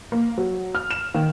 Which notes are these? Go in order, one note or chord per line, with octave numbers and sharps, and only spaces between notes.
A#3
F#3
F6
E7
D#3